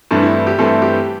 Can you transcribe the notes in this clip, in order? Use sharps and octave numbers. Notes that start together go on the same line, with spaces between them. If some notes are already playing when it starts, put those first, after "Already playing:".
G2 E3 A3 C4 D4
E4
E4
G4
G2 E3 A3 C4 A4
G4